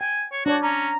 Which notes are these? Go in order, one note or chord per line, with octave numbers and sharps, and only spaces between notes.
G5 G#5
C#5
D4 F#4 C#5 D5
C#4 A#5